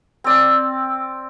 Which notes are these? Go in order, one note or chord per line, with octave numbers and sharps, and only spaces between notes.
C4 D5